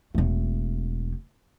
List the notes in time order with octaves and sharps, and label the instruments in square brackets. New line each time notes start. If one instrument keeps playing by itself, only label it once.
[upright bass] E1 A3